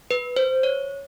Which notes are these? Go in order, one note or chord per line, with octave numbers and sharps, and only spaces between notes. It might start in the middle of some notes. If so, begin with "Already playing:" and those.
B4
C5
C#5